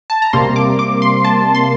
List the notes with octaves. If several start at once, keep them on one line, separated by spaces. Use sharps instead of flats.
A5
A#5
C3 G3 A#3 C6
D6
D6
C6
A5
C6